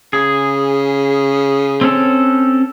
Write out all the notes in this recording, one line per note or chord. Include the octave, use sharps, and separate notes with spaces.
C#3 G#4
C4 C#4 A4